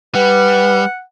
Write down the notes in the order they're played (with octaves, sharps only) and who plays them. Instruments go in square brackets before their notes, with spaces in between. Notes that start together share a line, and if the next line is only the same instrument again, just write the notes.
[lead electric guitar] G3 [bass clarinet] B4 [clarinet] F#5